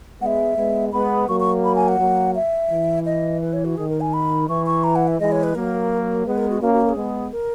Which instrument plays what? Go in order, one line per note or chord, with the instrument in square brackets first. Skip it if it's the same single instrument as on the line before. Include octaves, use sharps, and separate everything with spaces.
[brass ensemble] G#3 B3 [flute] E5 F#5
[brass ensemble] G#3 B3
[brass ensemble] G#3 B3 [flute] B5
[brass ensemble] F#3 A#3 [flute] C#6
[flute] C#6
B5
G#5
F#5
[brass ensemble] F#3 A#3
[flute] E5
[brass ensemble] E3
[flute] D#5
B4
C#5
F#4
[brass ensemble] D#3 [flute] G#4
[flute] A#4
G#5
B5
[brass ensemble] E3 [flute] C#6
[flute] C#6
A#5
F#5
E5
[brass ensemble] E3 G#3 [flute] D#5
[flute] C#5
B4
[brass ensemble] F#3 A#3 [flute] A#4
[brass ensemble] G#3 B3 [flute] B4
[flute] A#4
F#4
[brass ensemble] A#3 C#4 [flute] F#4
[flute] F#4
A#4
G#4
[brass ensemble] G#3 B3
[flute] A#4